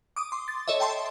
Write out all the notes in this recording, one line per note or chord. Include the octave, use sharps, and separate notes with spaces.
D6 D#6
C6
A6
A4 C#5 D#5 E5
G5 A5 C6